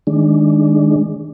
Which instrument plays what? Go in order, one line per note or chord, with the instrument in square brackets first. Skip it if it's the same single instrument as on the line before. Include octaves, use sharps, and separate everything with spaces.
[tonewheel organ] D#3 G#3 D4